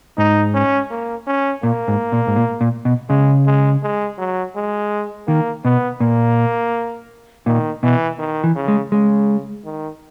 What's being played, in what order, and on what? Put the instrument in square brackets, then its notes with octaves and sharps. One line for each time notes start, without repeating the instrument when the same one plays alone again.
[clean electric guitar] G#2 [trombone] D#4
[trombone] C#4
A#3
C#4
[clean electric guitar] A#2 [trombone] A#3
[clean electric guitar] G#2
A#2
G#2
A#2
A#2
B2
[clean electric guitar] C#3 [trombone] G#3
[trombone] G#3
G#3
F#3
G#3
[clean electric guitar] D#3 [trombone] A#3
[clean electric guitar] B2 [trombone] B3
[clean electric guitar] A#2 [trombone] A#3
[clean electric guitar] A#2 [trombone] D#3
[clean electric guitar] B2 [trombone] E3
[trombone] D#3
[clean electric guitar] E3
[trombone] C#3
[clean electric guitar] G#3
[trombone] C#3 [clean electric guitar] G#3
[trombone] D#3